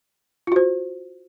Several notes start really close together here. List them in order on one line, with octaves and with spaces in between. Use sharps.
F4 F#4 C5